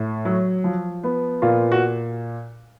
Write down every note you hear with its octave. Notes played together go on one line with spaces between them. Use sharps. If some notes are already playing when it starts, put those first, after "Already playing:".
Already playing: A2
F#3
F3
B3
A#2 F4
F#4